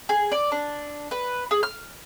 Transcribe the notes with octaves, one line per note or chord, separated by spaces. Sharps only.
G#4
D5
D4
B4
G#4
F6